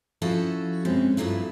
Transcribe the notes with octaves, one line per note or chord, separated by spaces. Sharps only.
F3 C#4 E4 F#4 A4
F#2 B2 G#3 C4 C#4
G2 F3 F#3 A3 E4